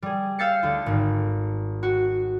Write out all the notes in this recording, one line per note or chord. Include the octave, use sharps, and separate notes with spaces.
G3 G#4
F5 E6 G6 A6 C7 C#7
D2 F4
G#1
F#4